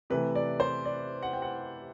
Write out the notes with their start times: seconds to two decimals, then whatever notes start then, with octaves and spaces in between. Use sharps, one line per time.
0.10 C3 E3 A3 B4
0.35 D5
0.60 C5
0.85 D5
1.23 F#5
1.33 G5
1.42 F#5